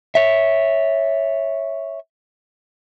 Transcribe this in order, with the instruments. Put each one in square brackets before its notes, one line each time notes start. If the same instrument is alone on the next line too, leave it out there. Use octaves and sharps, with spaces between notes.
[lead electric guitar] C#5 E5